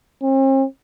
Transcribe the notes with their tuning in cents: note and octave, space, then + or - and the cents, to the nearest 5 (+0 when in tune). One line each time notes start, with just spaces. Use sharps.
C4 +45